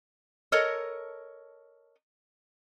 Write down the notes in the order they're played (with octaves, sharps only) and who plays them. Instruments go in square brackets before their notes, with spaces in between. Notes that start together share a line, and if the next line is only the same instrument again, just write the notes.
[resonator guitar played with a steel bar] A4 A#4 C#5 D#5